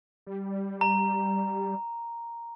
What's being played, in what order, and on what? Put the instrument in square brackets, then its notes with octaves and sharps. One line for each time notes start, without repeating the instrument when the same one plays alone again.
[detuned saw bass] G3
[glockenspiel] A#5